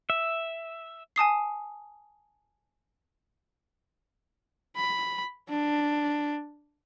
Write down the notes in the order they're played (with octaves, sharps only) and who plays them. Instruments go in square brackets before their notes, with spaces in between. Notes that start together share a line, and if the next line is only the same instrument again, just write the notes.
[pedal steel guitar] E5
[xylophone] G#5 A5 D#6 C7
[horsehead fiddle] B5
D4